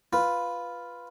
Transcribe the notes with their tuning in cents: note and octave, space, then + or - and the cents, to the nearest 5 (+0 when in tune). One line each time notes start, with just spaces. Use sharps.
F4 +0 B4 +0